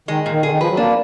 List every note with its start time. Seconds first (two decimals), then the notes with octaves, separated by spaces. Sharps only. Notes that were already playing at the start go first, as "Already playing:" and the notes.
0.08 D#3 G#3
0.26 A#2
0.31 D#3
0.43 D3 G#4
0.51 D#3
0.60 F3 B4
0.70 F#3
0.77 A#3 D4